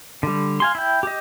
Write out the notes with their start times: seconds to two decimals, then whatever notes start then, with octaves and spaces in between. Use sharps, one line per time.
0.23 D3 G3
0.60 F5 G#5 C6
0.75 E4 G5
1.03 G4 D#5